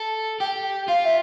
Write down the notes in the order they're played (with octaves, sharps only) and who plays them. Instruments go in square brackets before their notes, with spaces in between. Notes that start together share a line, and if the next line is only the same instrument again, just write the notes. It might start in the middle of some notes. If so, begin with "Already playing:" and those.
Already playing: [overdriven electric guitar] A4
[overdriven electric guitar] G4 [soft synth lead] G5
[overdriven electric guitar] F4 [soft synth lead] F5
[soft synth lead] E5